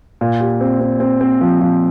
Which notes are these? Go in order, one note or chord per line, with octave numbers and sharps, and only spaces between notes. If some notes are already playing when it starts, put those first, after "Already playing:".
A#2
G4
C4
C4
C4
C4
F3
F3